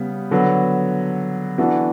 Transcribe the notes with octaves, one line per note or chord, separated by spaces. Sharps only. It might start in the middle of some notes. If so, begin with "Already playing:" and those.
Already playing: C#3 G3 B3
D3 F#3 B3 F#4
E3 B3 D4 F#4 A4